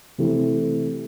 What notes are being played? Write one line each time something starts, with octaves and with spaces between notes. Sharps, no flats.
C3 E3 A3 E4